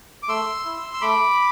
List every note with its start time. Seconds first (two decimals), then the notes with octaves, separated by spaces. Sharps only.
0.23 D6
0.28 A3 C6 E6
0.65 E4
0.93 E6
1.01 A3 B5 D6